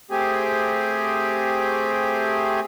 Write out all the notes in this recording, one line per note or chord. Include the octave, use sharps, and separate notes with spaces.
A3 C4 G4 G#4